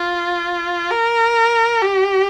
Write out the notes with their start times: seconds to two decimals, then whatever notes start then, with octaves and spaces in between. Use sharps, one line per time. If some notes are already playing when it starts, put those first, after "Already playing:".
Already playing: F4
0.91 A#4
1.82 G4